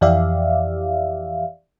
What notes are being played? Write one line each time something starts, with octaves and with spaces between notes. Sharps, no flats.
F2 E3 G4 D5 E5 F5